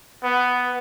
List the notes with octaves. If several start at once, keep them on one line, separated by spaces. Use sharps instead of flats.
B3